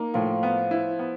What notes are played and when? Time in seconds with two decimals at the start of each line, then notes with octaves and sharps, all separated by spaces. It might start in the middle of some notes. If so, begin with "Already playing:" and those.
Already playing: A#3 D#4
0.14 A2 F3
0.43 B3
0.71 E4
0.99 B3